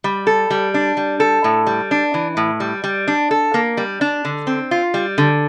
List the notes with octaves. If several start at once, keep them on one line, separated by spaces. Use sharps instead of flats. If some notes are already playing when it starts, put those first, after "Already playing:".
G3
A4
G3
D4
G3
A4
A2
G3
D4
E3
A2
G3
G3
D4
A4
A#3
G3
D4
D3
C4
F4
G3
D3